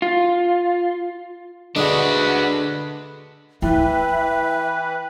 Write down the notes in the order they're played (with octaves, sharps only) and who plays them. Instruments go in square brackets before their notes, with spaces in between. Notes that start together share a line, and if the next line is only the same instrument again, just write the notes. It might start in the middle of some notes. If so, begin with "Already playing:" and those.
[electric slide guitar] F4
[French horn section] D3 [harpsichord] G#3 [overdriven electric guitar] D4 F#4 [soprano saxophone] B4
[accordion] E3 B4 [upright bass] E4 [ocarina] E5 [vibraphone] G5